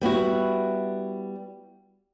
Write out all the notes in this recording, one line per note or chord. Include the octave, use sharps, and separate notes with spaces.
G3 B3 E4 F#4